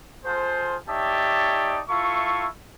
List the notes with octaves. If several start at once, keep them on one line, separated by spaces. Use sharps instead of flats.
F4 G#4 A4 C5
D#4 G4 C#5 D5 E5 A5
E4 F4 A4 E5 C#6